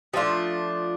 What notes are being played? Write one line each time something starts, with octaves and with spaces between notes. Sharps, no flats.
F3 A3 D4 F4